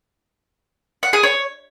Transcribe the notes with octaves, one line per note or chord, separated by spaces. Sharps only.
F#5
G#4
C#5